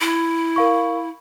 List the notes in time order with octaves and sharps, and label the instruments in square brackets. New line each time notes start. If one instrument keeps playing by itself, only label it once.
[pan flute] E4
[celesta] A#4 F5 C#6